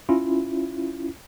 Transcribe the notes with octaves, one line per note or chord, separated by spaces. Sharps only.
C#4 E4 F4